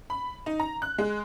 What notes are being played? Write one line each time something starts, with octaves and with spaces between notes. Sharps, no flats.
B5
D#4
A#5
F#6
G#3